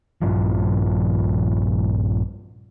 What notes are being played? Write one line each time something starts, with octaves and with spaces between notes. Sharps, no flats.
A#1 G2 F3